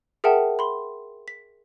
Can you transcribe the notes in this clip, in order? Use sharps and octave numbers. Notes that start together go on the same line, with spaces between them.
G#4 A#4 E5 F#5 G5 A5
B5 C6
B6